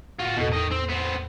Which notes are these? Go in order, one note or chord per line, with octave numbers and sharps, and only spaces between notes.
A2 F4 F#4
E2 B2 A4
D#3 D#5
C4
B3 C4